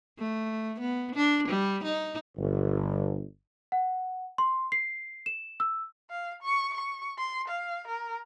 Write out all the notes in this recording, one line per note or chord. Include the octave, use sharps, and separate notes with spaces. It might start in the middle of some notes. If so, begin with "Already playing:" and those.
A3
B3
D4
G3
D#4
G1
F#5
C6
C7
E7
E6
F5
C#6
C#6
C6
F5
A#4